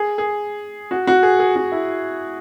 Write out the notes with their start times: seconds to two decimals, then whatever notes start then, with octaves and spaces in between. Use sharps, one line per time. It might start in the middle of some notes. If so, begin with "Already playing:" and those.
Already playing: G#4
0.18 G#4
0.91 F#4
1.07 F#4
1.23 G#4
1.40 G#4
1.56 F#4
1.72 E4